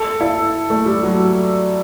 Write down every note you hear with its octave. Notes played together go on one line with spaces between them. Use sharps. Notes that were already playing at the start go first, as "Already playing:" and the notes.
Already playing: A4
E4
A3
G3
F#3